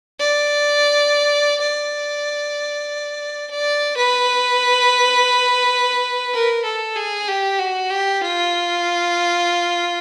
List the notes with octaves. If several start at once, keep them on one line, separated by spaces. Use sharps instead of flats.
D5
D5
D5
B4
A#4
A4
G#4
G4
F#4
G4
F4